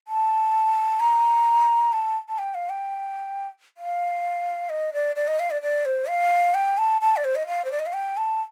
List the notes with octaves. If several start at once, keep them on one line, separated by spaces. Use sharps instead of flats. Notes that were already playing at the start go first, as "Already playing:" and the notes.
A5
A#5
A5
A5
G5
F5
G5
F5
D#5
D5
D5
D#5
F5
D5
D5
C5
F5
G5
A5
A5
D5
C5
D#5
F5
C5
D5
D#5
F5
G5
A5